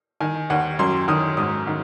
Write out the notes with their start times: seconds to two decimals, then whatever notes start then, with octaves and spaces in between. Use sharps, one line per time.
0.21 D#3 G#5
0.50 D#2 F#5
0.79 F#2 C6
1.08 D#3 D#6
1.37 G#2 D#6
1.67 D#3